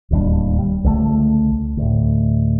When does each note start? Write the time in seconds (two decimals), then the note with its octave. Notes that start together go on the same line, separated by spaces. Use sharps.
0.11 D1 D#2 G3 D4
0.59 G3
0.84 C#2 D3 E3 A3
1.77 D2 A2